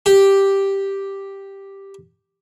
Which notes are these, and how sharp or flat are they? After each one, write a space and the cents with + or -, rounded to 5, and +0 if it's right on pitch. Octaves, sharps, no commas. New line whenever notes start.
G4 +0